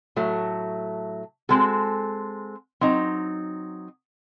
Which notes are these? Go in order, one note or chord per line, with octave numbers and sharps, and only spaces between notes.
A2 F#3 A3
G#3 C4 F#4 A4
F#3 C4 D#4